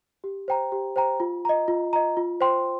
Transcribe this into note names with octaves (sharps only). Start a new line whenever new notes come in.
G4
C5 G5 A#5
G4
C5 G5 A#5
F4
D#5 A#5
F4
D#5 A#5
F4
C5 G5 C6